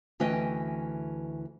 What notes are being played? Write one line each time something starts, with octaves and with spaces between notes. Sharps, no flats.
D2 E3 C#4 B4 D#5 G5